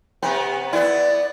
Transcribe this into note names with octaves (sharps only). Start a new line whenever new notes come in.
C3 B3
B3 E4 D5